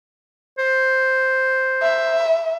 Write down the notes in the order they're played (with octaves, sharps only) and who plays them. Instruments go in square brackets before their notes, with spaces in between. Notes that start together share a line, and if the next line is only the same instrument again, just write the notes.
[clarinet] C5
[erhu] E5